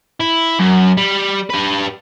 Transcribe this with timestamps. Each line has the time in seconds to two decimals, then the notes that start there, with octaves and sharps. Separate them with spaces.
0.20 E4
0.59 F#2
0.97 G3
1.50 G4 B4